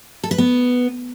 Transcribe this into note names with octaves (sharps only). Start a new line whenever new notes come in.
A4
B4
B3